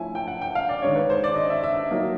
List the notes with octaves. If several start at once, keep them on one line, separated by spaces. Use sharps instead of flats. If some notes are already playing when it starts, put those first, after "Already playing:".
Already playing: F3 A3 C#4 E4 G#5
G5
F#5
G5
F5
D5
D#3 G#3 C#4 C#5
B4
C5
D5
D#5
E5
E5
F#3 A#3 D#4